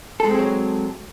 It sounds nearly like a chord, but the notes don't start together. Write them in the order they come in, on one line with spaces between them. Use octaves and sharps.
A4 G#3 C4 G#4 F#3